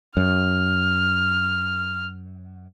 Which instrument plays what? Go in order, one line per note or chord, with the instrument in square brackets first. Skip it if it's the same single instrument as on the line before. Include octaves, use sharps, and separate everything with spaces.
[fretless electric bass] F#2 [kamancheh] F6